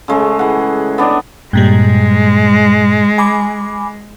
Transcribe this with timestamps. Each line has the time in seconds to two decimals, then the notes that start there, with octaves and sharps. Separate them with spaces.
0.08 C#3 G#3 A3
0.39 E3 F#5
0.98 B3 D4 D5 D#5
1.53 G2 A#2 G3 G#3
3.18 G#5 B5 D6